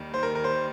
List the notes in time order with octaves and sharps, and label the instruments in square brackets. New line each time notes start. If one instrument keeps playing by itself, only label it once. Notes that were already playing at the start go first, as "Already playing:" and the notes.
Already playing: [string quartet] D#2 D#3 G3
[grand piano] C5
A#4
A#4
C5